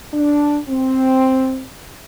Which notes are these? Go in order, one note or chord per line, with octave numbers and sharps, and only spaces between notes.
D4
C4